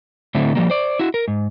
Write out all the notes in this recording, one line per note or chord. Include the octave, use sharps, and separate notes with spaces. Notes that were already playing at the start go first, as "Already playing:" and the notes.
A2 D3 A3 C4
F3 G3 A#3
C5 D5
E4 F#4
A#4
G#2